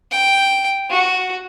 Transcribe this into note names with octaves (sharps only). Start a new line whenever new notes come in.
G5
F#4